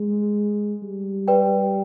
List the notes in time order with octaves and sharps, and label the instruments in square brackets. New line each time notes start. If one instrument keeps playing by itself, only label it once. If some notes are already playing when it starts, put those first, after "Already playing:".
Already playing: [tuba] G#3
G3
[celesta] G4 B4 D5 G5